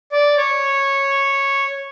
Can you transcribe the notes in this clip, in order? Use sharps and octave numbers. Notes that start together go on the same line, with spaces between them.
D5
C#5